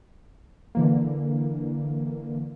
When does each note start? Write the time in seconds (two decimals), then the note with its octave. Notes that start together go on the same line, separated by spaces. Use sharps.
0.75 D3 E3 A#3